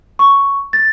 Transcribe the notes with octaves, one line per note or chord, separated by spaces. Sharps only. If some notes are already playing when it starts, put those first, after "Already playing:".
C#6
A6